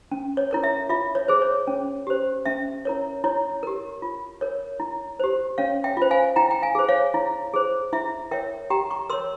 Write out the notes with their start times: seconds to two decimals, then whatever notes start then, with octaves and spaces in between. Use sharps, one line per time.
0.11 C#4
0.37 C#5
0.51 E4 A#4 C#5
0.64 E5
0.89 F4 E5
1.15 C#5
1.28 G#4 C5
1.42 C#5
1.67 C#4
2.07 G4 C5
2.46 C#4 E5
2.85 E4 A#4 C#5
3.24 E4 C#5
3.63 G4 A#4
4.02 F4
4.41 A#4 C#5
4.80 E4
5.19 G4 C5
5.58 C#4 C#5 F5
5.84 E5 G5
5.97 F4 C5
6.11 F5 G#5
6.36 E4 G5 A#5
6.51 G5
6.62 F5 G#5
6.75 G#4 C5
6.89 C#5 F5
7.14 E4
7.54 G#4 C5
7.93 E4 E5
8.31 A#4 C#5 E5 G5
8.70 G4 G5 A#5
8.91 A#5 C#6
9.10 A#4 C#5 C6 E6